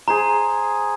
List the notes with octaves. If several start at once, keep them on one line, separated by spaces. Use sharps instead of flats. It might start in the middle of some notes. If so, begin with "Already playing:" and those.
G#4 C5 A#5 C6